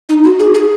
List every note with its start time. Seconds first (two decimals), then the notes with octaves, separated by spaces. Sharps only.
0.09 D#4
0.24 F#4
0.39 G#4
0.54 G#4